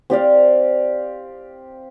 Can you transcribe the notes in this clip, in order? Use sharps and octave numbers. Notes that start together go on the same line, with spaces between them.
C4 G4 D5 F5